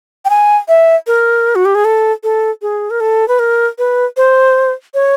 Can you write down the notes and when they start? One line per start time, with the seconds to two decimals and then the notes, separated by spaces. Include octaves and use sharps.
0.25 G5
0.30 G#5
0.68 E5
1.07 A#4
1.55 F#4
1.65 G4
1.75 G#4
1.85 A4
2.23 A4
2.62 G#4
2.90 A#4
3.00 A4
3.28 B4
3.39 A#4
3.78 B4
4.17 C5
4.94 C#5